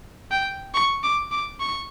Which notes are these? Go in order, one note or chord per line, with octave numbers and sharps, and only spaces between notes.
G5
C#6
D6
D6
C#6